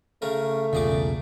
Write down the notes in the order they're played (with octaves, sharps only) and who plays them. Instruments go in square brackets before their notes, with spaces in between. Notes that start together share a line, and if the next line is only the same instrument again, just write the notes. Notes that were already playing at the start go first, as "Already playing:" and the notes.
[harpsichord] C#3 C#4 A#4 [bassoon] A3
[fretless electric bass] B1 E2 C#3 [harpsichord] A#2 G#4 D6